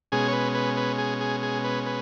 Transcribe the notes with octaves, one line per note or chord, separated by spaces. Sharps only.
B2 G#3 C#4 G#4
C#5
B4
B4
B4
G#4
G#4
G#4
B4
B4